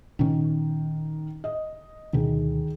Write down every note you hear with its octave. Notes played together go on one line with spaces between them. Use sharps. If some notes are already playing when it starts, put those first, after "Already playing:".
A#2 D#3 C#4
D#5
D2 B2 D#3 G#4